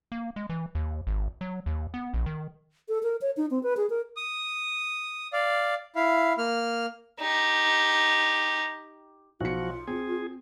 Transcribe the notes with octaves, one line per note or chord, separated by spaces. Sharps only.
A#3
G#3
E3
D#2
G#1
F#3
D#2
B3
A#1
D#3
A4
A#4
C#5
D#4
C4
B4
G#4
A#4
D#6
D5 F5
E4 F5
A#3 F6
D#4 G4
B1 F3 F4 F#4 C#7
C4 G#4